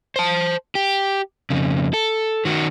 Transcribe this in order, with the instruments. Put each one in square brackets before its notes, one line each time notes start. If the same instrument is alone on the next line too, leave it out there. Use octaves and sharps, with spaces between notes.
[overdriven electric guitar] C5 A5
G4
F2 C#3
A4
D#3 F#4